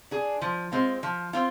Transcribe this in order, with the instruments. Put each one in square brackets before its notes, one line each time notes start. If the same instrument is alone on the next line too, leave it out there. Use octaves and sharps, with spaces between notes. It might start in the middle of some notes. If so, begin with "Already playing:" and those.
[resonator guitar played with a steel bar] D4 G#4
F3
G#3 C4 F4
F3
C4 F4